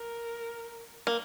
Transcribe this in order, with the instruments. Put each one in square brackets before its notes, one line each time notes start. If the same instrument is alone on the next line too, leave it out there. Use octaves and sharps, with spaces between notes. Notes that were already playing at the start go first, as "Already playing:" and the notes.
Already playing: [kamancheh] A#4
[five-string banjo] A#3